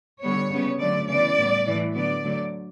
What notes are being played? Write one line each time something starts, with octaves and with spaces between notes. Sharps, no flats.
D3 G3 B3 C#5
C#3 G3 B3
D3 F#3 A3 D5
C#3 E3 B3 D5
A2 G3 B3
A2 E3 A3
D3 F#3 B3 D5
D3 F#3 A3